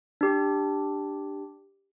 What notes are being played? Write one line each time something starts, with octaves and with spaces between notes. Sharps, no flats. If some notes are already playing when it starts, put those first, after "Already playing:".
D4 G4